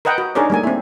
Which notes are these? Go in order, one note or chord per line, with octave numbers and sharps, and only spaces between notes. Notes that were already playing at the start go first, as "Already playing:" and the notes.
A#4 B4 D#5 F#5 G5
F#4
D4 D#4 G#4 A#4 C#5 D5
G3 A3 A#3 G#5
C4 E4